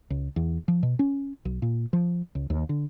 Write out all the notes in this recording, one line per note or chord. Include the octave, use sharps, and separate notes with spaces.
C#2
E2
F3
B2
C#4
B1
A#2
F3
C#2
D#2
D3